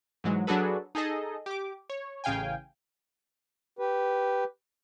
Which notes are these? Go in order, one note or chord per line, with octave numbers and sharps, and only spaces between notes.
G#2 E3 F#3 G#3
F#3 D4 F#4 G#4 A4 B4
D#4 G#4 A4 D#5
G4 D6
C#5
A1 C#3 F5 G5 G#5
G4 B4